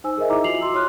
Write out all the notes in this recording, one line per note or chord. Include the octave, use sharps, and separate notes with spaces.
D#4 C5 G#5 E6
G#4 A#4 C5 D#5 E5
D#4 E4 A#5 D6
F4 F#4 C7 F7 F#7
E4 F#4 C6 E6
C#5 C6 F6 F#6